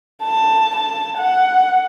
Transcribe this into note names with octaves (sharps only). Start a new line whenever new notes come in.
A5
A5
F#5